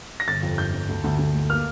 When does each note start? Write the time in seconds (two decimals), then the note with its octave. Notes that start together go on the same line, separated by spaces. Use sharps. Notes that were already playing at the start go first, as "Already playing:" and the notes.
0.20 A#6
0.28 G1 A6
0.43 F2
0.58 G1 G6
0.74 G1
0.89 D2
1.04 D2
1.19 D2
1.34 A3
1.50 A#3 F6